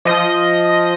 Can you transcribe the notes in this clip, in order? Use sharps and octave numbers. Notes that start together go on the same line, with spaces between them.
F3 D#5